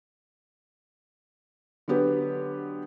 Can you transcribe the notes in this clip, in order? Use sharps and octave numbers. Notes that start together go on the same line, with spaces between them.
D3 F#3 B3 G4 B4